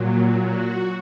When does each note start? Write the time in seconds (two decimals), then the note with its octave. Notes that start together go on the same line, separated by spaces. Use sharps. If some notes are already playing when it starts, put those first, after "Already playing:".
Already playing: A#2 F#3
0.45 F#4